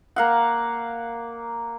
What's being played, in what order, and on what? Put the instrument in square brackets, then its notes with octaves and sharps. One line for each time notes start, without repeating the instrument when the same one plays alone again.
[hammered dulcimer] A#3 F5 F#5